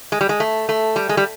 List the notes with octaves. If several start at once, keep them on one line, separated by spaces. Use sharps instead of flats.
G#3
G3
G#3
A3
A3
G3
G#3
G3